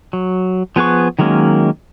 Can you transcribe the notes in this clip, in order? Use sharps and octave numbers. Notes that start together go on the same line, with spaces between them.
F#3
F3 B3 G#4 B4 C#6
D#3 F#3 G#3 A#3 C#4